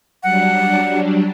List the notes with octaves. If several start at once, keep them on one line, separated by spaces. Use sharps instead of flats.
F#3 G3 D4 F#5